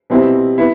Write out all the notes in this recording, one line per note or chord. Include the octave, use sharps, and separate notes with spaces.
B2 G3 C4 E4
B3 E4